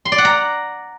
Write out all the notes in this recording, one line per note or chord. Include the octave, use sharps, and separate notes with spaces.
C6
D5
F#5
A#5